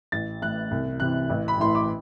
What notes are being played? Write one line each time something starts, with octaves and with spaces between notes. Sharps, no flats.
A1 A6
A2 E3 F#6
C2
C3 E3 F#6
A1
B5
A2 E3 C6
D6